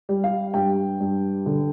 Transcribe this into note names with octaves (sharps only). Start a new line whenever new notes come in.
G3
F5
G2 G5
G2
D3